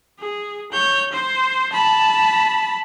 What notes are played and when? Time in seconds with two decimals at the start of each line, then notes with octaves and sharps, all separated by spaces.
0.20 G#4
0.72 C#5 G6
1.12 C5
1.72 A5 B5